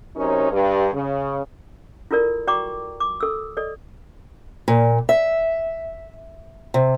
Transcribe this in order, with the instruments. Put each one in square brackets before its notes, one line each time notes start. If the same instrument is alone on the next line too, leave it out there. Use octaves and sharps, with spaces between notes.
[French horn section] C3 F#3 C#4 D#4 A#4 C#5
G2
C#3
[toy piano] E4 F4 A4 A#4 D5
F#4 D5 G5 A#5 C#6 D6
D6
A4 E6
A4 D5 D#5
[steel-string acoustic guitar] A#2
E5
C3